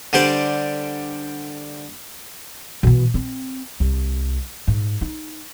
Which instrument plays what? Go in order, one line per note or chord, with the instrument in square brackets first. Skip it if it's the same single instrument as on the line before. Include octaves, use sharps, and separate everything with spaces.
[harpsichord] D3 G3 G4 C5 D5
[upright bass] B2 E3
C4
C2
G#2
D#4